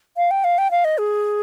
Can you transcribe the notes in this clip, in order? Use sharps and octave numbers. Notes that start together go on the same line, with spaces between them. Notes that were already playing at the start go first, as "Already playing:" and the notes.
F5
G5
F5
G5
F5
D#5
G#4